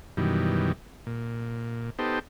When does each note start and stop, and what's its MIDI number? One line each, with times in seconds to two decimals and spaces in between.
0.17 0.72 42
0.17 0.72 47
0.17 0.72 51
0.17 0.72 52
0.17 0.72 55
1.07 1.90 46
1.99 2.19 59
1.99 2.19 63
1.99 2.19 67
1.99 2.19 69
1.99 2.19 72